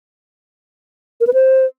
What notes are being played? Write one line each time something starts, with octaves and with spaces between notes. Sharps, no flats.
A#4
B4
C5